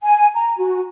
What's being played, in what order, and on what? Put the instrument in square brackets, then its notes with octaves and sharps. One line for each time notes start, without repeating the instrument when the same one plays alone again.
[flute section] G#5
A#5
F#4